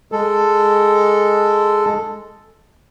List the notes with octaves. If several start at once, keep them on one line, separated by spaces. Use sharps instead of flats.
G#3 A4